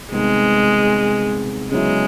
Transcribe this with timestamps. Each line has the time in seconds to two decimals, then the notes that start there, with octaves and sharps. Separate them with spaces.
0.12 C3 D#3 G3 G#3 B3 D#4
1.72 C#3 F#3 G#3 B3 E4